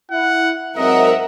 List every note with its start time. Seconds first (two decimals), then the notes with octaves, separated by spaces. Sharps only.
0.11 E4 F#5
0.77 G#2 F#3 C4 A#4 D#5 E5 F#5